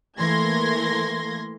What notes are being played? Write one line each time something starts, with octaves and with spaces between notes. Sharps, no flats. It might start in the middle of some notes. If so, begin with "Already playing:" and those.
E3 A3 A#3 C6 G#6 A#6